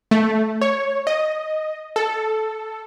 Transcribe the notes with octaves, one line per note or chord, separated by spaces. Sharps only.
A3
C#5
D#5
A4